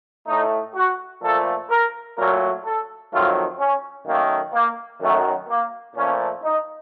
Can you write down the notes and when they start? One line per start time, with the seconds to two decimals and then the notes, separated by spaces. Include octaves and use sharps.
0.28 A2 A3 D#4
0.76 F#4
1.22 A#2 F3 A3 A4
1.70 A#4
2.17 A#2 F#3 A3 A#4
2.65 A4
3.13 F2 D#3 F#3 A3 F4
3.59 C#4
4.07 F#2 D#3 A3 A#3
4.54 A#3
5.01 F#2 D#3 F#3 A3
5.49 A#3
5.96 A#2 F3 A3 C#4
6.44 D#4